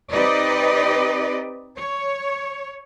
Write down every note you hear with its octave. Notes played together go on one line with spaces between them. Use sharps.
C4 D#4 G4 B4 D5 D#5
C#5